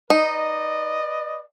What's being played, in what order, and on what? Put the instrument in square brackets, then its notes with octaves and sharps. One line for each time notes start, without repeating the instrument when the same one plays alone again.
[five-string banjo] D#4 [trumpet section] B4 D5 D#5